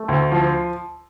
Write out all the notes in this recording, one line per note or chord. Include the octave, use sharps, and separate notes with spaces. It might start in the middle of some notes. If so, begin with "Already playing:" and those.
Already playing: A3
D2
F3